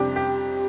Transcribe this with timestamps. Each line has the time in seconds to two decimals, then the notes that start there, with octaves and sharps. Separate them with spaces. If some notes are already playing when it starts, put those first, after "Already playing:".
Already playing: F2 C3 G3 D4 G4
0.16 G4